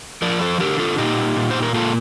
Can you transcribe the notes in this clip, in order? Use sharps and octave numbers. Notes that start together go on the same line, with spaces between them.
F3 A#4 D5
A4 C5
D3 G4 A#4
F4 A4
A#2 D#4 G4
A#2
C5
A#4
A#3 F4 A4